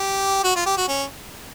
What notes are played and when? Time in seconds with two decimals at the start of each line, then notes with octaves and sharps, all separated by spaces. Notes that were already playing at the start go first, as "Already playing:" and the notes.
Already playing: G4
0.44 F#4
0.56 F4
0.66 G4
0.77 F#4
0.88 C#4